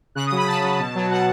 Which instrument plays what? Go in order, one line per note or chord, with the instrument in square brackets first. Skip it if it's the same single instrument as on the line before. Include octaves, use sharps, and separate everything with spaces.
[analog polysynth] C#3 F#6
D#6
F#3
B5
C#3 A5
F#3
B2
F#3
B2 F#5